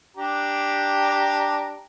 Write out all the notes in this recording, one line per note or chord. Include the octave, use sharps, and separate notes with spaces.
D4 G4 A#5